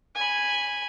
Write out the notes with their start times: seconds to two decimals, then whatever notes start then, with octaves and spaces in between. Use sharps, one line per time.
0.15 G#5 B5